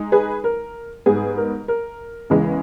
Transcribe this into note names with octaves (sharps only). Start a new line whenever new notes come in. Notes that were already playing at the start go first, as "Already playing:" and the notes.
Already playing: G#3 D#4
G#4 B4
A#4
G#2 G3 B3 G#4
A#4
A#4
E2 C#3 E3 G#3 B3